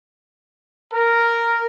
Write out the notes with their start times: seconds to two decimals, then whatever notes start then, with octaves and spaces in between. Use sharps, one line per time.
0.92 A#4